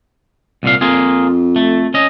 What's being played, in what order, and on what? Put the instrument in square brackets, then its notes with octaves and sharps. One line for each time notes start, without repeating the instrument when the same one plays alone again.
[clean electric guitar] C2 A#2 F5
[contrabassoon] F2 [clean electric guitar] A#3 F4 G#4
[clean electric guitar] A3
C#4 D#5